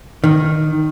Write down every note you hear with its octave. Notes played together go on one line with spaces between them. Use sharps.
D#3